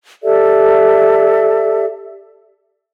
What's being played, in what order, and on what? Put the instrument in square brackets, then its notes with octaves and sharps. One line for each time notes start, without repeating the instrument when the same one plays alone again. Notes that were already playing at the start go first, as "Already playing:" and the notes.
[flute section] G4 A4 D5 E5